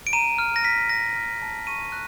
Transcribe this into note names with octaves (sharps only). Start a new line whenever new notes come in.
D7
A#5 D#7
F6
A#6
F6 B6
F6 A#6
F6
A5
C#6 D#7
F#6